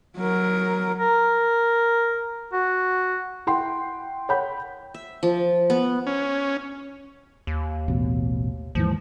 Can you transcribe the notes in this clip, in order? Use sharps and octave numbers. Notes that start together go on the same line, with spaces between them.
F#3 A#4
A#4
F#4
E4 F#5 G5 C6
C#5 F#5 G5 B5 G6
E5
F3
B3
C#4
D#2
A1 B2
D#2 G#2 E3 F3